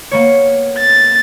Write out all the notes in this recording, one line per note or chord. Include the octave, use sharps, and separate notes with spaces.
A#3 B3 C#5
A6